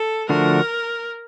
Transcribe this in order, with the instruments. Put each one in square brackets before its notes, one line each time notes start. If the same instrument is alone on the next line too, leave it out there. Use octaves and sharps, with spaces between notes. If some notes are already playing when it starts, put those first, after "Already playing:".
Already playing: [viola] A4
[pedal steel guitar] D3 F3 A3 D4 F#4 [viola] A#4